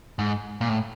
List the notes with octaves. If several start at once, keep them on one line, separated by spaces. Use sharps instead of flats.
G#2
A#2
A2